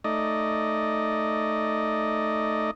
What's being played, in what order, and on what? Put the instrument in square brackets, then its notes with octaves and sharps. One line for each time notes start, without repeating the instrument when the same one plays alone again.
[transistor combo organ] A3 D#4 D5 D#5